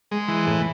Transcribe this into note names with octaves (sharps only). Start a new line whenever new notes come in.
G#3
E3
A2